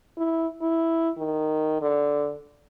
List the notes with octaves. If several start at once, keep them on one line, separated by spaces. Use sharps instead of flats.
E4
E4
D#3
D3